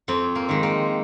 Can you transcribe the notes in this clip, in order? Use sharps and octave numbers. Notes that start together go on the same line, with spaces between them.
F2 C4
A#3
D#3 G#3
A#3